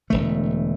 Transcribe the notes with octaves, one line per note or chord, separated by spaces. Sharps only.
E1 E2 D3 A3